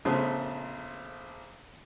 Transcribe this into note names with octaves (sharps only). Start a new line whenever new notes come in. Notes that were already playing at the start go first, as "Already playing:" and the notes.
A#1 C#3 A3 B3 G#4 C5